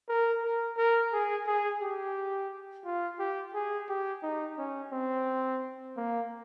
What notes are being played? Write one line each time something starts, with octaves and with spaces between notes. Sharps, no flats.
A#4
A#4
A#4
G#4
G#4
G4
F4
G4
G#4
G4
D#4
C#4
C4
A#3